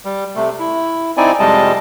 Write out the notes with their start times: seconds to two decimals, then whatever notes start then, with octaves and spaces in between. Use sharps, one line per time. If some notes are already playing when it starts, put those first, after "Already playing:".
0.05 G3
0.35 C3 A3
0.59 E4
1.17 C4 D#4 E4 D5 G#5
1.40 F2 C3 G3 G#3 D#5 A5